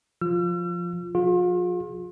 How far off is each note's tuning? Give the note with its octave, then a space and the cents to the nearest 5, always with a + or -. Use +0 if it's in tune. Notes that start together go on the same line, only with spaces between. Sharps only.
F3 +5 F4 +0 E6 +45
F3 +40 F4 +40 G#4 +0